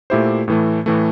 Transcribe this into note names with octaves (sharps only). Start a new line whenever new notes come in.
A#2 A3 E4 G4 C5
A2 E3 A3
A2 E3 A3